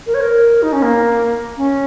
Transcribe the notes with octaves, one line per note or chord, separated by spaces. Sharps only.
A#4
C#5
A#4
D#4
C#4
A#3
C#4